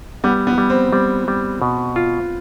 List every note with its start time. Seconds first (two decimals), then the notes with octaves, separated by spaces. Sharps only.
0.24 G3 B3
0.47 B3
0.58 G3
0.70 C4
0.92 G3 C4
1.28 G3
1.62 B2
1.96 F4